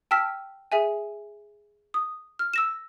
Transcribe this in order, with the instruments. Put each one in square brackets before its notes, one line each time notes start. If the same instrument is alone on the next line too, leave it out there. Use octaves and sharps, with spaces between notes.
[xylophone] G5 A5 E6 F6 B6
G#4 E5 G#5
D#6
F6
E6 A#6 E7